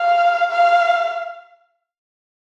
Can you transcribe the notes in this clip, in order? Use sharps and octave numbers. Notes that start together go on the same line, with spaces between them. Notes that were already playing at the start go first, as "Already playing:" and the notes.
Already playing: F5
F5